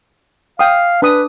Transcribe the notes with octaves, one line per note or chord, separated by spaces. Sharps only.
F5 G5 D#6
D4 B4 D#6